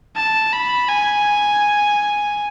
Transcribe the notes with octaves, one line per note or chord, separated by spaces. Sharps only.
A5
B5
G#5